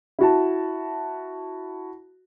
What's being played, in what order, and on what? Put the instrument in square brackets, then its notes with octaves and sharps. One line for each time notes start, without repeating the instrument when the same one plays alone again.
[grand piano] E4 F#4 A5